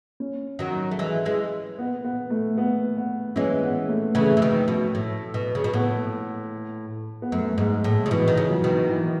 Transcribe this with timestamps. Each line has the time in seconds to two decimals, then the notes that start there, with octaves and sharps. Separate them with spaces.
0.20 C#4
0.59 D#3 F#3
0.91 A3
0.99 E3 G#3
1.25 E3 G#3
1.78 B3
2.04 B3
2.30 A3
2.57 B3
2.97 B3
3.36 E3 G#3 C#4
3.63 B3
3.89 A3
4.15 C#3 E3 A3
4.37 E3
4.42 B2 D#3
4.68 B2
4.95 A2
5.34 B2
5.55 C#3
5.64 B2
5.74 A2 B3
7.22 B3
7.32 F#2 A3
7.58 G#2 G#3
7.84 A2 G#3
8.06 C#3
8.11 B2 E3
8.28 D#3
8.37 C#3
8.50 F#3
8.64 B2 D#3
8.89 E3